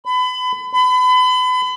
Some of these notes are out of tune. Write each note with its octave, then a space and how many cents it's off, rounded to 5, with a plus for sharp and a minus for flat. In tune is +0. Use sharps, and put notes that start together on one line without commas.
B5 +30
B5 +35